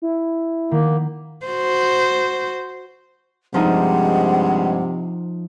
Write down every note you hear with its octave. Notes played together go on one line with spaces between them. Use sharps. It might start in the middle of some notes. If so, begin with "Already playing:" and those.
E4
D#3 A#3 B3
F#4 C5
G2 C3 F3 G#3 D#4 F#5